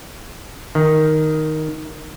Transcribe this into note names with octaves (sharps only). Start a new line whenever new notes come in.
D#3